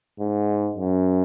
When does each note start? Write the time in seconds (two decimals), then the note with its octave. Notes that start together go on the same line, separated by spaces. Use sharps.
0.20 G#2
0.75 F#2